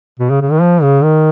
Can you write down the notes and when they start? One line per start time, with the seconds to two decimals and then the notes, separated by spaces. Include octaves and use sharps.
0.20 B2
0.30 C#3
0.41 C#3
0.51 D#3
0.61 F3
0.82 C#3
1.03 D#3